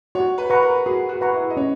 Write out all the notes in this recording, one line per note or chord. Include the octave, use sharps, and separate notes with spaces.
F#4 C#5
B4
B4 F#5 A#5 C#6
A#4
F#4 G#4
F#4
B4 F#5 A#5 C#6
E4
D#5
C#4 C#5